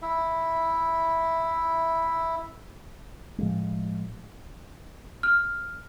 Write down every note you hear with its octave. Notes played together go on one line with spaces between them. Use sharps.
E4 E5
A2 F3 G#3
F6